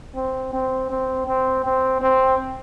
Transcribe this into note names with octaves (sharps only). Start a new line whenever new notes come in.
C4
C4
C4
C4
C4
C4